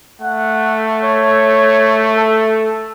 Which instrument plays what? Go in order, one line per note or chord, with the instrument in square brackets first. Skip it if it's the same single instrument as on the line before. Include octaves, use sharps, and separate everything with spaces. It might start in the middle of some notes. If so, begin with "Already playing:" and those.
[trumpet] A3 [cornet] F#5
[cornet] C#5
A4